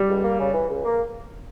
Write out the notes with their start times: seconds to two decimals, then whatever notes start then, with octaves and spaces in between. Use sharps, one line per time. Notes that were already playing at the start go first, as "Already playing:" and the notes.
Already playing: G3
0.09 C#2
0.23 A#3
0.39 C#3
0.54 E3
0.69 C#2
0.85 A#3